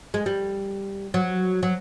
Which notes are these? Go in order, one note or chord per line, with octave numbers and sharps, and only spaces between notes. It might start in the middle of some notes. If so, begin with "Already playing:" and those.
G#3
G3
F#3
F#3